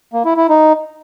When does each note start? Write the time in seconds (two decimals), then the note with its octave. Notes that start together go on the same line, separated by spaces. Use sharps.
0.13 A#3
0.25 E4
0.37 E4
0.49 D#4